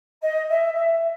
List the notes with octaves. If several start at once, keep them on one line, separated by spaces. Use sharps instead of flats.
D#5
E5
E5